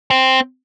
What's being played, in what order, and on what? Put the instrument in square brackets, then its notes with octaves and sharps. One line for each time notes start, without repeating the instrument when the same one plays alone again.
[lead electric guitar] C4